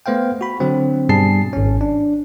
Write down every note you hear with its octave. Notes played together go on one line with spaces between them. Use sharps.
A3 B3 C5 F5 G5
F#4 B5
D3 F#3 C4
G2 B2 G3 G#4 A5 C7
G#1 C#4
D4